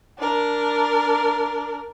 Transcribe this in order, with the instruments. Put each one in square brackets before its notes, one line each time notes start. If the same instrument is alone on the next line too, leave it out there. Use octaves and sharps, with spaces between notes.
[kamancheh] D4 A#4